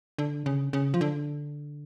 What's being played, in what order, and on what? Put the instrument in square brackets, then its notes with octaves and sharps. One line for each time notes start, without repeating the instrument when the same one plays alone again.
[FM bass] D3
C#3
C#3
F3
D3